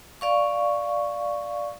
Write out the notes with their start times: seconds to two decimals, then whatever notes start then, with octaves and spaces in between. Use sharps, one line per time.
0.21 D5 F5 C#6